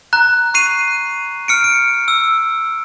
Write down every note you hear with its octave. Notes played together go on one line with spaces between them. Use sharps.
A#5 F#6
C#6 F#6 C7 D#7 F7
F6 C#7 D7
D7
E6